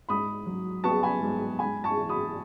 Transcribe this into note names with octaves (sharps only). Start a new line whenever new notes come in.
G#2 B5 D#6
F#3
B3 A5 C#6
G#5 B5
G#2
G#2 G#5 B5
A5 C#6
E3
B5 D#6